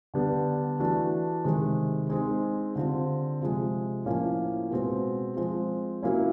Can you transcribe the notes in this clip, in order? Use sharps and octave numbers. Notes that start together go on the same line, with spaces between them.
D3 G3 B3 D4
E3 A3 D4 F#4
C3 D#3 G#3
G#3 C4 D#4 G#4
D3 G3 C4 F4
C3 F3 G#3
A2 F3 A#3 C#4
B2 G#3 C4
F3 G#3 C4
F#3 A#3 C#4 E4